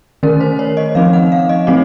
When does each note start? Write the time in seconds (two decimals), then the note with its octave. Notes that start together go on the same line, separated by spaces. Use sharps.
0.23 D#3 A3 C#4 A#4
0.40 C5
0.59 C#5
0.77 D#5
0.95 F3 C4 D#4 F5
1.13 F#5
1.32 F5
1.49 D#5
1.67 F#3 A3 C4 D#4 C#5